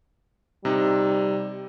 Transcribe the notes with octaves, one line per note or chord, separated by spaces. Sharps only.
C3 G3 D#4